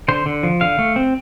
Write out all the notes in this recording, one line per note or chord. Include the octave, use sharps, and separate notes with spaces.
D3 C5
D3
F3
D3 F5
A3
C4